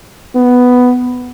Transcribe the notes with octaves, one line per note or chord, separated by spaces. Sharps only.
B3